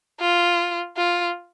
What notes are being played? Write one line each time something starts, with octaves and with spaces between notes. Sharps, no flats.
F4
F4